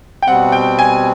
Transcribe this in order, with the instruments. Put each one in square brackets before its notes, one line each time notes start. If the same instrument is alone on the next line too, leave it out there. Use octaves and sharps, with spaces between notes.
[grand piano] G5
[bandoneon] B2 G3 C4 [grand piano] F#5
[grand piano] G5
G#5